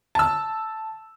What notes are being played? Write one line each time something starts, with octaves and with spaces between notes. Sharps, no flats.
A5 E6